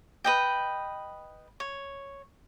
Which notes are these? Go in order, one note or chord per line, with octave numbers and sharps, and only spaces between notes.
B4 D#5 G5
C#5